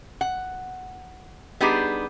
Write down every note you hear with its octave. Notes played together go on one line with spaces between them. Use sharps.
F#5
G3 B3 D4 D#4 G4 G#4